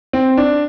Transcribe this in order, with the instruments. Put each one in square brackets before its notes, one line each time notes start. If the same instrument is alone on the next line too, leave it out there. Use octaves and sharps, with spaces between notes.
[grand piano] C4
D4